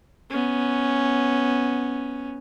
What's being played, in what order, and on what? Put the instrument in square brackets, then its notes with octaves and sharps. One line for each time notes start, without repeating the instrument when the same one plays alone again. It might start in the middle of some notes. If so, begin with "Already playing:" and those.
[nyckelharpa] B3 C#4